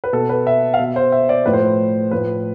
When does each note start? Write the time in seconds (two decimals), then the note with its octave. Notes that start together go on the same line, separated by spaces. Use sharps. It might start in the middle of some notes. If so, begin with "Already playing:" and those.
0.04 B4
0.13 B2 A4
0.29 B4
0.47 E5
0.74 F5
0.79 B2 E5
0.96 C5
1.12 E5
1.29 D5
1.45 A2 F3 B4
1.53 C5
1.60 B4
2.11 A2 F3 B4